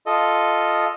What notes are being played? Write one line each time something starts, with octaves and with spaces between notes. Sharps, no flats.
F4 A4 D#5